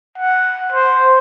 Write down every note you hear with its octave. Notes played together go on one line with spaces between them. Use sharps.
F#5
C5